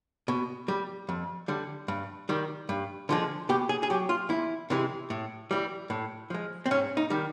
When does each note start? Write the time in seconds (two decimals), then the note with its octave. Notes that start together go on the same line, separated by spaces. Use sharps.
0.28 B2
0.68 G3
1.09 F2
1.48 D3 G3
1.88 G2
2.29 D#3 G3
2.69 G2
3.09 D3 F3 G#3
3.49 B2 G4
3.69 G#4
3.83 G#4
3.90 F#3 G4
4.09 F4
4.29 E2 E4
4.70 C3 E3 G#3
5.10 A2
5.51 E3 G3
5.90 A2
6.30 F3 G#3
6.66 C4
6.71 G#2 C#4
6.97 D#4
7.10 D#3 G3